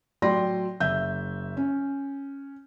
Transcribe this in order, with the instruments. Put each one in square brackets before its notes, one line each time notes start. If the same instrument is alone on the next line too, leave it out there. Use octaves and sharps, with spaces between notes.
[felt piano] A2 F#3 D5 G5 C6 A#6
F#1 E5 G6
C#4